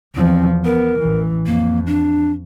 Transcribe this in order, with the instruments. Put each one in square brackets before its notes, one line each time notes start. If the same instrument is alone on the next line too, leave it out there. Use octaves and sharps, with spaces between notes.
[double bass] E2 F3 [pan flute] C4
[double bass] B3 [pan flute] A#4
[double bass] A1 E3
[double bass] F2 [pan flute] A#3
[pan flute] D4